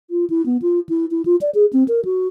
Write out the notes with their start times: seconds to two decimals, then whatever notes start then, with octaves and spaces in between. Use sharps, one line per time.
0.11 F4
0.30 E4
0.46 B3
0.62 F4
0.89 E4
1.11 E4
1.26 F4
1.41 D5
1.55 G#4
1.73 C4
1.88 A#4
2.05 F#4